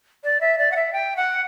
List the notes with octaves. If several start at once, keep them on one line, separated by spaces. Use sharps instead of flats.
D5
E5
D5
F#5
E5
G5
F#5